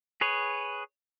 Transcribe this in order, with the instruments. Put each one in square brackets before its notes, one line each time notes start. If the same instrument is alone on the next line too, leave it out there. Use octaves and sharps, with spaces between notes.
[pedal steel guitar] G#4 B4 C#5